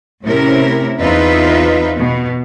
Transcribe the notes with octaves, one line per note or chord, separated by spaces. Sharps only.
A2 C3 C#4 E4 A#4
E2 C4 D#4 F4 B4 E5
B2